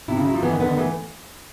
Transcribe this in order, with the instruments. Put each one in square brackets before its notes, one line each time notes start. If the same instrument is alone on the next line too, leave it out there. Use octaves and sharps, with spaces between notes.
[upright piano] C3 [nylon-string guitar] E4
[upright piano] C#3
[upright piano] F#3 [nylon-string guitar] E4
[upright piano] F3
[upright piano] E3 [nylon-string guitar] B3
[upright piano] D#3
[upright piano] D3 [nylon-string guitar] B3
[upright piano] D#3
[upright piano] E3 [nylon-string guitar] A3